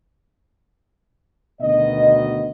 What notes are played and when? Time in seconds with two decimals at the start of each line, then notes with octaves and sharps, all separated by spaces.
1.61 D2 B2 D#3 B3 D#5